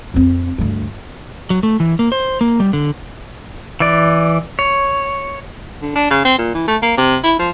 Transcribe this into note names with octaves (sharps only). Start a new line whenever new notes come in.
F2 C4
D2 G2
F#3
A3
E3
A#3
C5
A#3
G3
D3
E3 D5
C#5
D3
D4
C#3
C4
A#2
E3
A3
A#3
C3
E4
F3